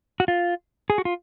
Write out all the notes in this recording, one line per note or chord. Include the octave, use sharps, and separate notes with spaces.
F#4
F4
G#4
F#4
F4